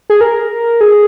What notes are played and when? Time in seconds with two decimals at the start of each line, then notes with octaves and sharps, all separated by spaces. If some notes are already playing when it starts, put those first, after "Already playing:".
0.10 G#4
0.21 A#4
0.81 G#4